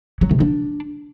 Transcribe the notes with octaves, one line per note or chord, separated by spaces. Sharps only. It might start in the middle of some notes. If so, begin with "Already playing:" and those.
F#3
C3
D4